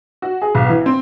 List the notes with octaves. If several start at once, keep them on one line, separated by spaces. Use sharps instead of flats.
F#4
G#4
B1
E3
C4